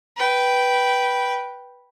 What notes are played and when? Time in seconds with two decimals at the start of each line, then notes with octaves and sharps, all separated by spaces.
0.17 B4 G5